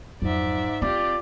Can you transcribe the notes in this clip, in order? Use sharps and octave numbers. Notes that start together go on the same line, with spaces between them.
F2 G#2 F#3 D5 E5
C4 F4 G4 D5